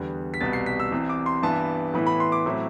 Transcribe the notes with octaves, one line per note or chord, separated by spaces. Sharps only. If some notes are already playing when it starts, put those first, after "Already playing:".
Already playing: E2 D3 G3 B3
B6
C2 B2 G3 B3 A6
C7
B6
E6
C2 C3 E3
D6
C6
G2 E3 B3 A5
A2 E3 B3 E4 B5
B5
C6
D6
A2 F#3 A3 C4 E4